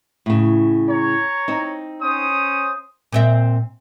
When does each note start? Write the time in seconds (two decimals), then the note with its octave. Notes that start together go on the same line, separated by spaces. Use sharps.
0.26 A2 C#3
0.88 C#5 A#5
1.48 C4 D#4
2.01 C#4 C5 D#6
3.12 A#2 C4 E5